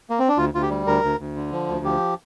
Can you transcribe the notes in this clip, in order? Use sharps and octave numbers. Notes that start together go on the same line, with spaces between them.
A#3
C4
D4
D2 F4
D2 F4
G4
G3
D2 A#4
D2
D2
D3
F3
D2
F3 G4